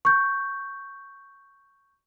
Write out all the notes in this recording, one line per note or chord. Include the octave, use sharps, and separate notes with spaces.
C#6 G6